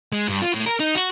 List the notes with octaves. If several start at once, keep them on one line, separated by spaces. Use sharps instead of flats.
G#3
G2
F4
A2
A#4
D#4
F#4